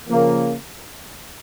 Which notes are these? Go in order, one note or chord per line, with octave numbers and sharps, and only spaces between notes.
C#3 F3 A#3